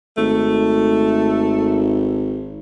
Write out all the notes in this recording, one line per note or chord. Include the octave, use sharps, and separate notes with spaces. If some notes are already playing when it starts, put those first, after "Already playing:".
G#1 A3